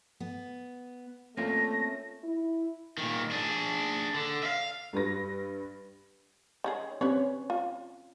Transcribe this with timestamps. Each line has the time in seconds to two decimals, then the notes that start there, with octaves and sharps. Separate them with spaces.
0.20 B3
1.37 A3 A#3 C4 C#4 F4 A#6
2.24 E4
2.98 A#2 D#3
3.31 D4 G#4
4.15 D3
4.43 E5 F5
4.93 G2 G3 B4 A#6
6.64 D#3 C#4 G#4
7.01 C4 C#4 G4 B4 C#5
7.50 F4